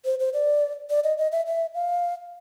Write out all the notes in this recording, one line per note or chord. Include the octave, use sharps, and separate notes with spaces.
C5
C5
D5
D5
D#5
D#5
E5
E5
F5